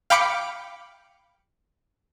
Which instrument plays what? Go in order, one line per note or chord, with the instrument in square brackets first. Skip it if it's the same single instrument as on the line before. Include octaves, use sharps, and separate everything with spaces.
[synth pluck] F5 G5 B5 D6 C#7 D7